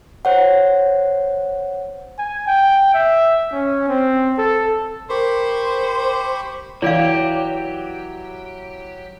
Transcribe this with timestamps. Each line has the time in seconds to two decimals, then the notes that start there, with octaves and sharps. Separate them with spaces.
0.25 C5 C#5 F#5
2.19 G#5
2.47 G5
2.94 E5
3.52 C#4
3.89 C4
4.38 A4
5.10 G4 A#4 C5 B5 C#6
6.82 E3 F#3 G4 C#5 D5 F5